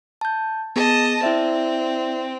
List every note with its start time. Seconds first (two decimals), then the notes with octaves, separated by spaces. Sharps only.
0.21 A5 G6
0.76 B3 G#4 D#5 A5
1.23 C4 E4 D5 E5